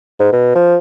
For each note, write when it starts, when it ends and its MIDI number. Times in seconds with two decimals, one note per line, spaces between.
0.19 0.31 44
0.33 0.51 47
0.55 0.77 53